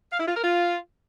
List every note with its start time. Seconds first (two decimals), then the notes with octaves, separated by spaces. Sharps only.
0.12 F5
0.20 E4
0.28 F4
0.36 A#4
0.44 F4